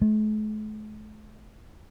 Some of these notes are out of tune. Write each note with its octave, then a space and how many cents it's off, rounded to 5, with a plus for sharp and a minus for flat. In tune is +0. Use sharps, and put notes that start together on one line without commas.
A3 -45